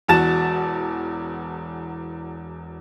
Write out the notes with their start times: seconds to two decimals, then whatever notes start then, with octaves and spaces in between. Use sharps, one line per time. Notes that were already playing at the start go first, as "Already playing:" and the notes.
0.08 E1 E2 F#4 A5 A6 E7